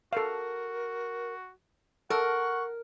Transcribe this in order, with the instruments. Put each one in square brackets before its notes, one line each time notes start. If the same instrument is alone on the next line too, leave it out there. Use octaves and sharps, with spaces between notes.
[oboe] F#4 [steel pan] A4 F5 [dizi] A#4
[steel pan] A4 [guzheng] A#4 [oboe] F#5 [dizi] C#6